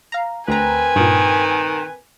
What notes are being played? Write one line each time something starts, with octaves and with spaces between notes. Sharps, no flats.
F5 A#5
D2 C4 A#4 B4 G#5 A#5
G2 A#2 D#3